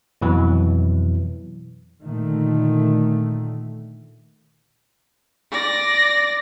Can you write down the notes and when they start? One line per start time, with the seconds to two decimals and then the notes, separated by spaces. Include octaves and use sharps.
0.21 F2 B2 E3 F#3
2.03 A#2 D3 D#3 A3
5.52 D5 A#6